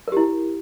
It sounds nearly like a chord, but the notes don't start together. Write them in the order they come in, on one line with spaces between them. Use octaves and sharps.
A#4 G4 E4